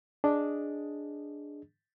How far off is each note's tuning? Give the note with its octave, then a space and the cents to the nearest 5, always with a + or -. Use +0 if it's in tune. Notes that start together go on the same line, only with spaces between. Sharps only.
D4 +0 G#4 +0 D#5 +0